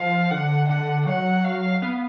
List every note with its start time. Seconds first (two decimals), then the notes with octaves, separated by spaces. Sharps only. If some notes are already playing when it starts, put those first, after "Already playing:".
Already playing: F3 F5
0.30 D3 F#5
0.69 D3 F#5
1.06 F#3 F#5
1.45 F5
1.82 B3